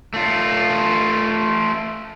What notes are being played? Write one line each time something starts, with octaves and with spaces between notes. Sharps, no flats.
A3 F4